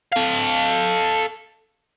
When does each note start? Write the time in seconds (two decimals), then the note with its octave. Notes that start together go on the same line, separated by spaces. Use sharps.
0.12 A4 F5